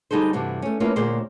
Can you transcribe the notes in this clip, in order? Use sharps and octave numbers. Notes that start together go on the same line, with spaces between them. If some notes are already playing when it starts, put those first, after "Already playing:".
D3 G3 D#4 G#4 A4 C5
G2 C3 E3 D4 F#4
A3 C#4
A#3 C#4 D4 E4 F4 B4
D2 A#2 A#3 G#4 C5 D5